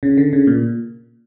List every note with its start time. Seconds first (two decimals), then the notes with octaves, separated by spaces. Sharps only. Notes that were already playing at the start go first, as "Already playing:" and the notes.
0.03 C#3
0.18 D3
0.33 C#3
0.47 A#2